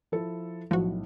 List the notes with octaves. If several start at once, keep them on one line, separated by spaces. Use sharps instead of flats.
F3 E4 A4
B1 A2 F3 F#4